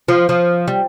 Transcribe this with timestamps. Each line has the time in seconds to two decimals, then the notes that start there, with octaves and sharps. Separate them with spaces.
0.08 F3
0.29 F3
0.68 G3